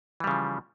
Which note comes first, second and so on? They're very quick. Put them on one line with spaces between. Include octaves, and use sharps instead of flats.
E3 G3 C#3 F3